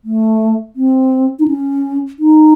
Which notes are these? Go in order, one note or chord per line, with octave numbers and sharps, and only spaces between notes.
A3
C4
D#4
C#4
D#4